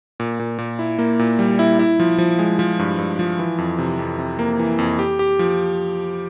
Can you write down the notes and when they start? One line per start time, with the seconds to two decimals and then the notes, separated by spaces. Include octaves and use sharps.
0.20 A#2
0.39 A#2
0.58 A#2
0.79 E4
0.99 A#3
1.19 A#2
1.39 G3
1.59 E4
1.79 E4
2.00 F3
2.18 F3
2.39 G#3
2.59 F3
2.79 G2
2.98 G2
3.19 F3
3.39 E3
3.58 F2
3.78 C3
3.99 F2
4.19 C3
4.39 A#3
4.59 E3
4.78 F2
4.99 G4
5.19 G4
5.39 F3